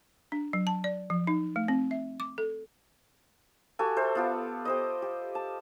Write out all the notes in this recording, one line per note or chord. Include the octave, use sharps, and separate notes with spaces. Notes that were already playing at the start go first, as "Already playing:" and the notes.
D4
F#3
A5
D5
F3
D#4
A3
C4
E5
D6
A4
F#4 G4 A4 G#5
A4 C5 E5
B3 F4 G4
G4 C5 D#5
G4
A5